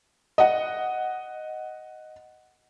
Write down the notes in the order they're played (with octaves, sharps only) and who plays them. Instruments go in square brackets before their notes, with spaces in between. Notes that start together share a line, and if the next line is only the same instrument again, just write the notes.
[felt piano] D#5 F#5